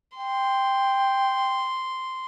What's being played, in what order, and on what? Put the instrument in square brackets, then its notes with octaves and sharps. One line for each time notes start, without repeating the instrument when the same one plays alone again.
[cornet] G5 [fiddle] C6